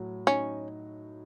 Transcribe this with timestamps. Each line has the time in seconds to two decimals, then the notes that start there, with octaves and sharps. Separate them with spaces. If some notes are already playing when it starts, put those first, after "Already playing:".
Already playing: A2 F#3
0.27 C#4 D#4